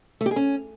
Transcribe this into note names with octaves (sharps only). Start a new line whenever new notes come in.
A3
G4
G#4
C#4